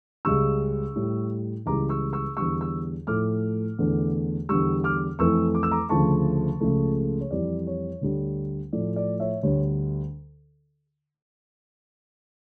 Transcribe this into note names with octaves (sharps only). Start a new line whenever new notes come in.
C#2 C#3 G3 C#6 E6
A2 G3
C#2 C#3 E3 G3 A#5 D6
C#6 E6
C#6 E6
E2 D3 G3 C#6 E6
C#6 E6
A2 F3 A3 D6 F6
E2 D3 A3
E2 D3 G3 C#6 E6
D6 F6
F2 E3 A3 C#6 E6
D6
E6
A#5 D6
D2 C#3 F3 A3 A5 C#6
C#2 C#3 F3 A3
C#5
F2 E3 G3 D5
C#5
D2 D3 G3
A2 F3 A3 D5
D5
C#5 E5
D2 D3 G3 C#5